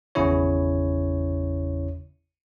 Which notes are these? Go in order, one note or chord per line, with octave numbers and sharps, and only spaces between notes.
G#1 E2 C#3 C#4 E4 C#5